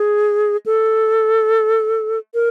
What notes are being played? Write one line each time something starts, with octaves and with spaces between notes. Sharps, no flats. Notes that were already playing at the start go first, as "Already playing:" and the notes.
Already playing: G#4
A4
A#4